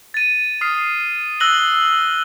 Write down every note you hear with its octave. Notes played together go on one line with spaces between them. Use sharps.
A6 D#7
D#6 F6 C7
E6 F#6 A#6 F#7 G7